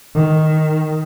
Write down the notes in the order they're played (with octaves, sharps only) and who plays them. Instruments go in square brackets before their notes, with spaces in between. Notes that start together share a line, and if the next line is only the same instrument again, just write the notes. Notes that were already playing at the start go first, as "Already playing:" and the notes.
[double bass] D#3